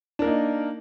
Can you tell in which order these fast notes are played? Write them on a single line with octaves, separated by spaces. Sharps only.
D4 A#4 A#3 D#4